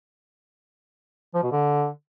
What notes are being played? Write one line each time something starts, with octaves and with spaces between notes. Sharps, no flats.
F3
B2
D3